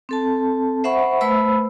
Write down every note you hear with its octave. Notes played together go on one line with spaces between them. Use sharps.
C4 A4 A5
C5 E5 F#5 B5 C#6
A3 B4 C5 B5 E6